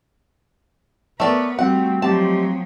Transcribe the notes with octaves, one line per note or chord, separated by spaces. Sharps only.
A3 B3 A#4 B4 C#5 D5
G3 A3 C4 F#4 F#5
F3 F#3 G#3 A3 C4 G4 A5